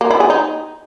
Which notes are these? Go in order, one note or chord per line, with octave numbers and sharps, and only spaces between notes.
A#3
E4
G#4
D#4